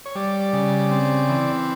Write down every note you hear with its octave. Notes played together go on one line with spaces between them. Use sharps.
C#5
G3 D5
C#3
C4
E3